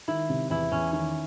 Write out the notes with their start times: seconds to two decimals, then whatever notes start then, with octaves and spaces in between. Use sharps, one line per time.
0.08 D#3 E4
0.29 C3
0.50 E2 E4
0.72 E2 C#4
0.93 D#3 C#4